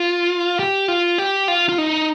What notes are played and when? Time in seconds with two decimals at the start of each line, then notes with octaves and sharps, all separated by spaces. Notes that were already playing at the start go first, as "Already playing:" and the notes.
Already playing: F4
0.59 G4
0.88 F4
1.18 G4
1.48 F4
1.69 F4
1.78 D#4